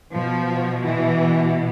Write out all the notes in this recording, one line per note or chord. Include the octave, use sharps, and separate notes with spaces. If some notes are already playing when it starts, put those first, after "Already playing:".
B2 F3
E3